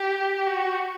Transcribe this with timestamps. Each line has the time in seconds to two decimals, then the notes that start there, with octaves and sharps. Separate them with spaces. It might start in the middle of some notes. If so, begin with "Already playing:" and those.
Already playing: G4
0.46 F#4